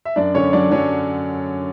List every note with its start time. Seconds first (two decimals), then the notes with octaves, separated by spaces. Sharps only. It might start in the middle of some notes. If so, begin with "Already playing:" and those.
0.05 E5
0.16 F#2 D4 D5
0.34 D3 C#4 C#5
0.53 F#3 D4 D5
0.71 F#3 C#4 C#5